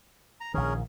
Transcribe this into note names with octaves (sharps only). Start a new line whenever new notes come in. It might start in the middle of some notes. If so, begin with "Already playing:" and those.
A#5
A#1 D#3 C#4 G#4 A#4